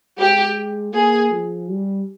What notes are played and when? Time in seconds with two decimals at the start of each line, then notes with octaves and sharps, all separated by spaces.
0.18 G#3 G4
0.93 A#3 G#4
1.31 F3
1.69 G3